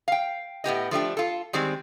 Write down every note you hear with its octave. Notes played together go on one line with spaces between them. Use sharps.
F5 G5
A2 B3 G4 D#5
F3 A3 D4 G4
F4 A4
D#3 G3 G#3 C4